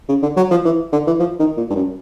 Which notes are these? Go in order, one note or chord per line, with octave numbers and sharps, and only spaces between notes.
C#3
D3
F#3
F3
E3
D3
E3
F3
D#3
A#2
G2
F#2